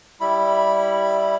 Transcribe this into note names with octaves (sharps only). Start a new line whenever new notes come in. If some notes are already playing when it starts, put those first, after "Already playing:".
G3 E4 B5